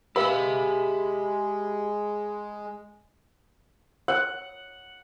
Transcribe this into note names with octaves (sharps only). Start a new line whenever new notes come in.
G#3 G4 A#4 B4 E5 F5 B5
F#5